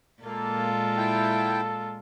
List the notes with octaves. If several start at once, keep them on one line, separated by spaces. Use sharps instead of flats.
A#2 G#3 A#3 F4 A4
E4 G5